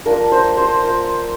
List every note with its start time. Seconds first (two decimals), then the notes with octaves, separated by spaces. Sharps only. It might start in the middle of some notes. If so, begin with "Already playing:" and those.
0.06 A#3 D4 F4 A#4
0.32 C5
0.57 C5
0.83 A#3 F4